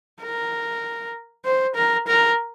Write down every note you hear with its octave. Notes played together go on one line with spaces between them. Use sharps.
A#4
C5
A#4
A#4